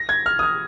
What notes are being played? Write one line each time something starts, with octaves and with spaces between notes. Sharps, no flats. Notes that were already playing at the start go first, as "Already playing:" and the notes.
Already playing: A#6
G#6
F6
D#6
F6